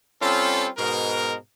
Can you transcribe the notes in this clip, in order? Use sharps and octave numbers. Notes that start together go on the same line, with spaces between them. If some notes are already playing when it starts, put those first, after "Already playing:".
G3 C4 C#4 F4 A4
G#2 B2 A#4